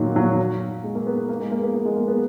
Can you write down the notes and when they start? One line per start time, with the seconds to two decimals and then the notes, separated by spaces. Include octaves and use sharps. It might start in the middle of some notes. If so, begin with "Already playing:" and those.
Already playing: A#2 D#3 F#3
0.16 F#3
0.84 G#3
0.95 A#3
1.07 B3
1.18 B3
1.29 A#3
1.40 G#3
1.51 A#3
1.63 B3
1.74 A#3
1.85 G#3
1.96 A#3
2.08 B3